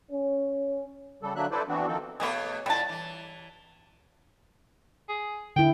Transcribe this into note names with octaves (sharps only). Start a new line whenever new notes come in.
C#4
C#3 G3 A4
D3 F#3 A#3 D4 E5 F#6
E4 A4 B4 C5 D5
E3 B3 C4 D4 F#4
D#3 F3 C4 A4
B2 A3 B3 G#4 C#5
A#2 G3 E4 A5
E3
G#4
D3 E4 G5